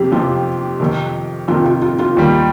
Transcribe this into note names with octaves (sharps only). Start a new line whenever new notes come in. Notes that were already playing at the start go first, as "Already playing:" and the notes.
Already playing: F2 C3 G4
F2 C3 F3 F4
F2 C3 D#3
F2 C3 D#3 F4
F4
F4
F4
D#2 D#3 G3